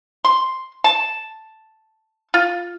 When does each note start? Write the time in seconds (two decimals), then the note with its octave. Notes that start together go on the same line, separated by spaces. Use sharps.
0.25 C6
0.84 A5
2.34 F4